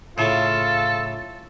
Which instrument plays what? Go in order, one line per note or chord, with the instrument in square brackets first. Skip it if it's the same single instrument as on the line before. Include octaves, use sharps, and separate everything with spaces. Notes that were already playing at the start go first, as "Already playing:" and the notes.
[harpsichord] A2 C#3 [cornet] F4 [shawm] A4